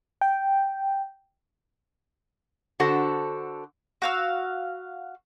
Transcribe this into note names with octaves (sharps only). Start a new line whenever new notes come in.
G5
D3 F#4 A4 C5 F#5
F#4 F5 E6